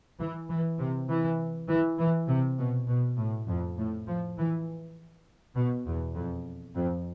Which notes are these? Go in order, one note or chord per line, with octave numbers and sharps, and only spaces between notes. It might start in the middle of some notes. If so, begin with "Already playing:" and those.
E3
E3
C3
E3
E3
E3
C3
B2
B2
A2
F2
A2
F3
E3
B2
E2
F2
F2